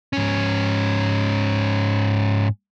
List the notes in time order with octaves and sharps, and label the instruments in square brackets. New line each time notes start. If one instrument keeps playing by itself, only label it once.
[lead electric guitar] G#2 C#4